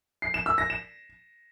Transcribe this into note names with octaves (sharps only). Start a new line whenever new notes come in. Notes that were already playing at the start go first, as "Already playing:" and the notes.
C7
E7
E6
A#6
E7